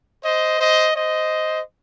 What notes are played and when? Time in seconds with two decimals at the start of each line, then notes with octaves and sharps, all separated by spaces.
0.23 C5 D#5
0.59 C5 D#5
0.95 C5 D#5